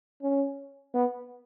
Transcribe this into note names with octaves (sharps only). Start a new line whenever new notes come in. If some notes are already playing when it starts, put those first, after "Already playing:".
C#4
B3